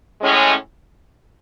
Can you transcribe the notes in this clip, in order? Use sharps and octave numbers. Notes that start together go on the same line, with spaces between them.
A2 G#3 C#4